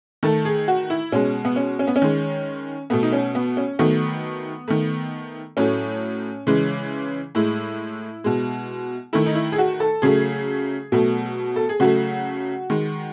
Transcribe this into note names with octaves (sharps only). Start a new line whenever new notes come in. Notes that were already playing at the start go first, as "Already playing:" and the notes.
D#3 A3 A4
G#4
F#4
E4
B2 G#3 C#4
B3
C#4
C#4
B3
C#4
D#3 G#3
B2 A3 B3
D#4
C#4
B3
C#4
D#3 F#3 A3 B3
D#3 A3
A2 F#3 A3 C#4
C#3 E3 G#3
A2 G#3 E4
B2 G#3
D#3 A3 E4
D#4
E4
G#4
F#4
A4
C#3 F#3 A3 G#4
B2 F#3 A3
A4
G#4
C#3 F#3 A3 F#4
D#3 G#3